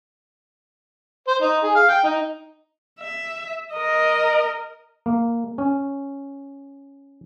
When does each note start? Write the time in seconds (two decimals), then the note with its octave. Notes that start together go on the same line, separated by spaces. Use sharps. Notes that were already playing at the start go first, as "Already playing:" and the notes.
1.28 C5
1.42 D#4
1.64 G#4
1.76 F5
1.89 G5
2.04 D#4
3.00 E5
3.73 A#4 D#5
5.06 A#3
5.58 C#4